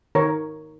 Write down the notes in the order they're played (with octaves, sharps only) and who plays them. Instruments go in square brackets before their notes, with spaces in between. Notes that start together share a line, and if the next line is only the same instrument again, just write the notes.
[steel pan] D#3 A#4 C#5